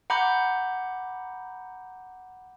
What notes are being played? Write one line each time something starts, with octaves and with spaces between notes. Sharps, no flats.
F#5 A#5 B5 D6 G6